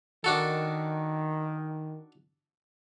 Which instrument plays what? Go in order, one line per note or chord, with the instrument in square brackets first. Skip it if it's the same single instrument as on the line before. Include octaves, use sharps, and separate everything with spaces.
[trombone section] D#3 [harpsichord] D4 F#4 A4